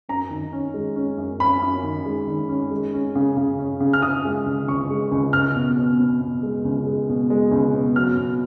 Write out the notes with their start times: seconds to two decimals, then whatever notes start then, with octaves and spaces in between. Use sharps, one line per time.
0.09 F#2 A#5
0.30 D#3
0.53 C#4
0.74 G#3
0.96 C#4
1.18 F#2
1.40 C#4 B5
1.62 F#2
1.83 D#3
2.06 G#3
2.27 D#3
2.49 C#4
2.71 G#3
2.94 C#4
3.16 C#3
3.37 C#3
3.59 C#4
3.81 C#3
3.93 F6
4.02 C#3 D#6
4.25 G#3
4.46 C#2
4.67 C#2 C#6
4.90 G#3
5.12 C#2
5.33 C#2 F6
5.55 B2
5.77 B2
6.00 B2
6.21 B2
6.43 G#3
6.65 C#2
6.86 G#3
7.09 B2
7.30 G#3
7.52 C#2
7.74 B2
7.96 F#3 F6
8.17 B2